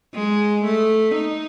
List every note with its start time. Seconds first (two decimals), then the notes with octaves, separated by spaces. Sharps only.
0.14 G#3
0.65 A3
1.15 D#4